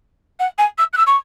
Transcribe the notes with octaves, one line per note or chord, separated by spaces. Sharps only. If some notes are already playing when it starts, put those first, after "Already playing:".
F#5
G#5
E6
F#6
E6
C#6